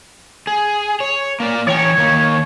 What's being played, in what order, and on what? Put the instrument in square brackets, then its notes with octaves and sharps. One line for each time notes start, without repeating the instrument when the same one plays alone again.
[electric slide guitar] G#4
C#5
A#3 A#4 D5
[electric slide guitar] E3 G5 [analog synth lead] C#5
[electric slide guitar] D#3 A#3